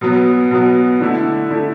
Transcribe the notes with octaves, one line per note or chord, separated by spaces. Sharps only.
B2 F#3 B3
B2 F#3 B3
D3 A3 E4
D3 A3 E4